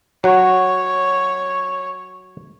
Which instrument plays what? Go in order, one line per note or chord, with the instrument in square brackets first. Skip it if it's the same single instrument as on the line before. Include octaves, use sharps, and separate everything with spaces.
[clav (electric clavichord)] F#3 F#4 [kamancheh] C#5